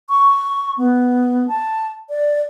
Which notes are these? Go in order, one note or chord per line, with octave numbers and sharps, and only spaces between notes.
C#6
B3
A5
D5